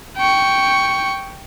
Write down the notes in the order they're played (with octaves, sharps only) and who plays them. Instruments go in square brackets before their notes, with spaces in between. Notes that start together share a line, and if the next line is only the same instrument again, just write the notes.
[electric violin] G5 C#6